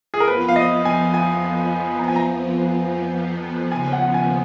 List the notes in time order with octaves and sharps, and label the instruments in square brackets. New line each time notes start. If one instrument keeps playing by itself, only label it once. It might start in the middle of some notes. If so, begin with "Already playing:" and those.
[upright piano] G#4
A#4
[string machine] F2 F3 B3 [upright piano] B4
[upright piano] F5
D#5
G#5
G#5
A#5
G#5
A#5
[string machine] D#2 C#3 F3 B3 [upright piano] G#5
[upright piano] F#5
G#5